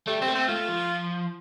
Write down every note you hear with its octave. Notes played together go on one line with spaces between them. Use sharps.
G3 A3
G3 C4
A3
C4
A3 F4
F3